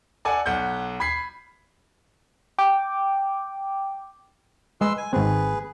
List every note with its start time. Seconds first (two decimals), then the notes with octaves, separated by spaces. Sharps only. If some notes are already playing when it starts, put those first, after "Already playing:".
0.25 A4 D5 F#5 G#5
0.46 B1 F#5 G6
1.00 B5 G#6 B6 C7
2.59 G5 D6
4.81 G#3 G#4 B4 C6 E6
4.97 G#5
5.13 G#1 C4 G#4 B4